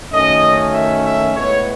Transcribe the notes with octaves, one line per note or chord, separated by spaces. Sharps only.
F#2 D#3 A3 C#4 D#5
E5
E5
A2 G#3 B3 C#5